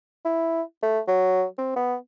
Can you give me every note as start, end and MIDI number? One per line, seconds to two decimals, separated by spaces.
0.25 0.62 64
0.83 1.00 57
1.08 1.44 54
1.58 1.73 60
1.76 1.96 59